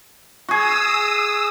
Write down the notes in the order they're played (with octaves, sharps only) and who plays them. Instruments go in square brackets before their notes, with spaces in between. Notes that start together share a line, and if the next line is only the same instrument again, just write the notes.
[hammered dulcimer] F#4 G#4 [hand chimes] C#6 G#6 [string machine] D#6 E6